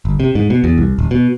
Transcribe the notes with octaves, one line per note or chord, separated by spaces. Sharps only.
G1
C3
G#2
B2
E2
C2
D#1
B2